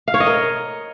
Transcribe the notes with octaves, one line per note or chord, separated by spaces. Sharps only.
F5
C#5
D#5
A#4